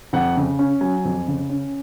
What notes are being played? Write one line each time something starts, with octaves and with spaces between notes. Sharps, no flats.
F2 F#5
C#3
C#4
F#3 G#5
F2
C#3
C#4